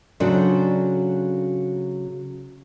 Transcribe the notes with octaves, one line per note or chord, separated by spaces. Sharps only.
C#3 F#3 D4 A4 C5